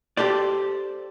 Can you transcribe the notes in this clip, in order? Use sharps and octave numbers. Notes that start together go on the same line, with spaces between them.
G4 A4 C5 D5